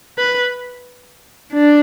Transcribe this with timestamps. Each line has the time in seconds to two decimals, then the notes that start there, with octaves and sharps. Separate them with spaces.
0.18 B4
1.52 D4